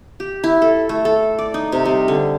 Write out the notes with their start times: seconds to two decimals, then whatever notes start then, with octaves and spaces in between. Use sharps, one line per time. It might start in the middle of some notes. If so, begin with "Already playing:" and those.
0.20 G4
0.44 E4
0.62 A4
0.89 A3
1.05 A4
1.39 D5
1.54 D#4
1.72 C3
1.85 G3
2.08 D3